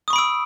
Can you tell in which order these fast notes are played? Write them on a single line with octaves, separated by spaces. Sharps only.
D#6 C#6 B5 D7 E6